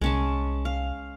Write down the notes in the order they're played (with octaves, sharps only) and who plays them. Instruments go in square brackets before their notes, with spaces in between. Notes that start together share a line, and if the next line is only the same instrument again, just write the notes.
[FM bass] C2 [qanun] G#3 C#4 A5
[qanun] F5